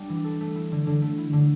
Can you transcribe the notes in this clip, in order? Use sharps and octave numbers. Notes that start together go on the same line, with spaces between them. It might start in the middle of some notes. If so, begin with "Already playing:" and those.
Already playing: G3 D4
E3
A4
A3
E4
D3
D3
A3
E4
D3